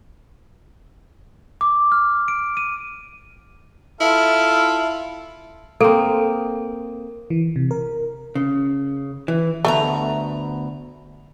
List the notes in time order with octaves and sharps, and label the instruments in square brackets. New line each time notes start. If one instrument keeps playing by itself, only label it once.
[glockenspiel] D6
F6
D7
D#7
[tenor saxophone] E4 [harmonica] F4 A4 F5
[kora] A#3 C4 [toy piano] A4
[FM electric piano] E3
C3
A#4
[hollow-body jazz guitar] C#3
E3
[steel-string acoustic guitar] D2 B3 A#5 [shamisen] A3